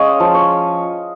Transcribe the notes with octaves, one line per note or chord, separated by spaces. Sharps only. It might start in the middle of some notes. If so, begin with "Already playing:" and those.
Already playing: G#3 C#4 C#5 D#5 F5
F3
C#5